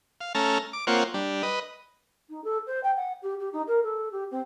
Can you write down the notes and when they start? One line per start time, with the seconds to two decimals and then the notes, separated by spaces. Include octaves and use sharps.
0.21 F5
0.35 A3 C#4 A5 A#5 F6
0.73 D6
0.87 A#3 C4 F4 C#5 F#5
1.14 G3 D4
1.43 B4 D#5
2.29 D#4
2.44 A4
2.66 C5
2.83 G5
2.96 F#5
3.22 G4
3.39 G4
3.53 D#4
3.67 A#4
3.83 A4
4.12 G4
4.31 C4